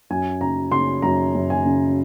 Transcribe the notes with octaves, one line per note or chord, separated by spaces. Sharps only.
F#2 G#5
C#3 A#5
C#3 C6
F#2 A#5
F#2
G#5
C#3